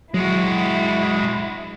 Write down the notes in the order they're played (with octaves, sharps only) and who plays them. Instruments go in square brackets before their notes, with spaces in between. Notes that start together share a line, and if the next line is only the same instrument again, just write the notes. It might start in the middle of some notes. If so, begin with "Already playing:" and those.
[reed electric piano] F#3 [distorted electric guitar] G#3 F#4 [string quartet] E4